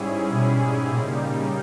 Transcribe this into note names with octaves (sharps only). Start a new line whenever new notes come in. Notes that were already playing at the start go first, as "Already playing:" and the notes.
Already playing: G#2 G3 C#4 E4 G#4
B2
A#2 C#3 G3 A#3 D#4